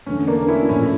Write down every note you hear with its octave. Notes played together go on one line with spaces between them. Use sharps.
E2 D3 A3 C#4
A#3 D4
C#4 E4
A2 F3 A3 C#4 E4